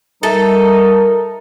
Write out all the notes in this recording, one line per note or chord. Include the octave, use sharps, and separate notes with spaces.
G3 D#4 A4 A#4 E5